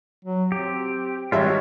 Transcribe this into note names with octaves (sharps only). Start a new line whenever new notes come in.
F#3
C4 G4
G#1 G3 F4 F#4 C#5 E5